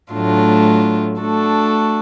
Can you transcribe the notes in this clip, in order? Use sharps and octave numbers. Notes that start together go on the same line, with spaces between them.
A2 F#3 A3 D4 F4
A3 D4 F#4 A4